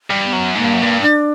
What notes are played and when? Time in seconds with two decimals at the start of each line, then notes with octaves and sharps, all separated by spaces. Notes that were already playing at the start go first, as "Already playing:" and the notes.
0.10 G2
0.24 B3
0.33 F#2
0.55 G#2 A#3
0.64 G2
0.73 F#2
0.82 G2
1.02 D4